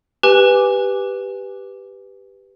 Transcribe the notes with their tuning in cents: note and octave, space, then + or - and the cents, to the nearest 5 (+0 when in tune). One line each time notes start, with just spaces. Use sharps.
G4 +0 B4 +0 G#5 -15